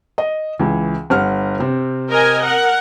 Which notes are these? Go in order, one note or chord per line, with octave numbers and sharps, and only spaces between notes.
D#5
C#2 E3
G1 F#5 F6
C3 C4
A#4 D#5 G#5
A#4 F#5